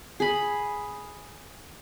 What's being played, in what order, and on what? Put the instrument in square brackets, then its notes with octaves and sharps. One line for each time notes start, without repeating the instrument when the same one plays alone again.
[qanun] G#4 B5